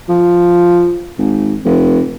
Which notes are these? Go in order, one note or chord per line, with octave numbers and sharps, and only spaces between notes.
F3
G#1
F1